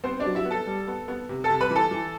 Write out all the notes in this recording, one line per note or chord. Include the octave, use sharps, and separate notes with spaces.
B3 C4 C5
D4 D5
F#3
E4 E5
B3
A4 A5
G3
B3
B3
C3
A4 A5
C3
B4 B5
E3
A4 A5
E3